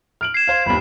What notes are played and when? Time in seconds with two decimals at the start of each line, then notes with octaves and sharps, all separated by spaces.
0.21 F6 D7 F#7
0.34 G#6 C7 E7
0.48 C5 F5
0.66 G1 D#2 B5